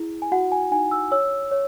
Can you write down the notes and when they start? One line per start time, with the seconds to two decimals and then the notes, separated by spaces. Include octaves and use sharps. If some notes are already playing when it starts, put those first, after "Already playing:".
Already playing: E4 G#4
0.22 G#5
0.32 F#4 F#5
0.52 G#5
0.71 D#4 G#5
0.91 E6
1.12 C#5 E6
1.52 C#5